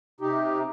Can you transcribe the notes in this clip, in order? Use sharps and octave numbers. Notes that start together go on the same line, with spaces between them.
C3 D#4 G4